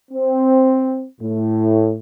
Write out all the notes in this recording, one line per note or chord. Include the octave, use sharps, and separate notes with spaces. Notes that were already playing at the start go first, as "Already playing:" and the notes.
C4
A2